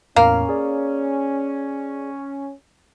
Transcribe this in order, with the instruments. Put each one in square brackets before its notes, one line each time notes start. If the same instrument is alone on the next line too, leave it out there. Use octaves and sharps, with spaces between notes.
[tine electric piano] E2 A2 [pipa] A#3 [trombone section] C#4 [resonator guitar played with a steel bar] F5
[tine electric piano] G#4 D5